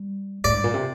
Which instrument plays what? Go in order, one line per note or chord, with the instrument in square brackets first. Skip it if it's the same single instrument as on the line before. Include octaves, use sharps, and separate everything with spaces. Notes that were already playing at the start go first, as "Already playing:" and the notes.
Already playing: [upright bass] G3
[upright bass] A2 [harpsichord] D5
[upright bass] G2
A#2
C3